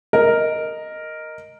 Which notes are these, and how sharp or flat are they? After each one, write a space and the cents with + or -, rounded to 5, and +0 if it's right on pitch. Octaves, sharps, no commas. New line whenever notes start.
A#4 +0 D#5 +0